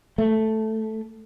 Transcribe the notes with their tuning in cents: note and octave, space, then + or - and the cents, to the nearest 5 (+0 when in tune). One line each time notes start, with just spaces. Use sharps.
A3 +0